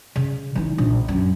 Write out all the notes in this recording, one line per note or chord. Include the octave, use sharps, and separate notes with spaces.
C#3
E3 D#4
A#1
F#2